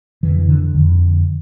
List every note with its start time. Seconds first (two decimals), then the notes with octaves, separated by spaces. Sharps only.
0.23 F2 D3 E3
0.49 D3
0.75 F2 D3